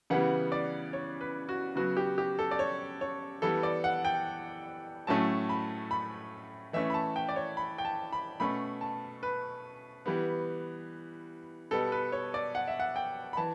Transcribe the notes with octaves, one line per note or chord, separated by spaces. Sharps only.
C#3 E3 G3 B3 F#5
D5
C#5
B4
F#4
C#3 F#3 B3 F#4
G4
G4
A4
D5
C#5
C#5
E3 G3 B3 A4
D5
F#5
G5
A2 F#3 A3 C#4 A5
B5
B5
E3 A3 C#4 E5
B5
A5
G5
D5
C#5
B5
G5
A5
B5
B2 A3 C#4 B5
A5
B4
E3 G3 B3
B2 G3 B3 A4
B4
C#5
D5
F#5
E5
F#5
G5
B5
E3 A5